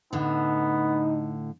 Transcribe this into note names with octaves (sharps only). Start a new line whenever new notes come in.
A2 D3 B3 D#4